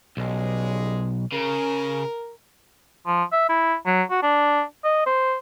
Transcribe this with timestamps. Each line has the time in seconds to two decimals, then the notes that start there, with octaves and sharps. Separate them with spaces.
0.17 B1 C#3 G3 G#3
1.32 C#3 A#4
3.07 F3
3.32 E5
3.49 E4
3.86 F#3
4.11 F#4
4.23 D4
4.84 D#5
5.07 C5